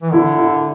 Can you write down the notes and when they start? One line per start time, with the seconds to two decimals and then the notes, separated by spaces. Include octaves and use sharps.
0.02 E3
0.13 D3 E4
0.38 E4